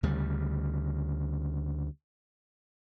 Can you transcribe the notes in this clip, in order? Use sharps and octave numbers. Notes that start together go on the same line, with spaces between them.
D2 C#3 G3